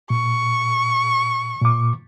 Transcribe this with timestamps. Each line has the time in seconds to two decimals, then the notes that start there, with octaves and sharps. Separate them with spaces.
0.10 A#2 C#6
1.61 A#2 D6